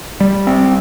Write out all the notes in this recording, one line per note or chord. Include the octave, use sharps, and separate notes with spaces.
G3
C4